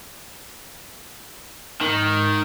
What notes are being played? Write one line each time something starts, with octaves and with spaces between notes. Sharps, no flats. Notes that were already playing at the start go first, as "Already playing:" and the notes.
G#2 D#3